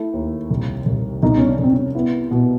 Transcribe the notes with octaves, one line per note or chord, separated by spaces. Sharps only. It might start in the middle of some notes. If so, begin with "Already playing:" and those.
Already playing: A3 E4
D#2
C2
C2
C2 D#4
C#4
D4
C2 C4
C#4
B3 E4
B2 B3